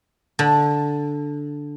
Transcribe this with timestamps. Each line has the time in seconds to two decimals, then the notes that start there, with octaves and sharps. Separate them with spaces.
0.39 D3